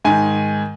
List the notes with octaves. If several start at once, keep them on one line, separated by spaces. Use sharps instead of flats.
G#2 D#3 G#5